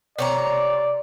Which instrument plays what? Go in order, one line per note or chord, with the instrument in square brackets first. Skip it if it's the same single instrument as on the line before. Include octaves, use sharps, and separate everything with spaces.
[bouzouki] C3 C#5 A#5 [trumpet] D5